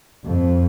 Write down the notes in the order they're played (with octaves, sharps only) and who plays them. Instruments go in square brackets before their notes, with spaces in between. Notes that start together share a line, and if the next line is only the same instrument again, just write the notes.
[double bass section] F2